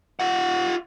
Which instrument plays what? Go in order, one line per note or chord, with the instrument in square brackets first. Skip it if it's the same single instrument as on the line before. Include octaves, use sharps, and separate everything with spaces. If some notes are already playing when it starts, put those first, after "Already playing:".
[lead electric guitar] F4 F#5